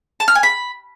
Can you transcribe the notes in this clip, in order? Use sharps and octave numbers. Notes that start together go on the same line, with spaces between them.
A5
F6
G#5
B5